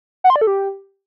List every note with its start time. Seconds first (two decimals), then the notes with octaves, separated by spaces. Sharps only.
0.24 F#5
0.30 C6
0.36 D5
0.41 A4
0.47 G4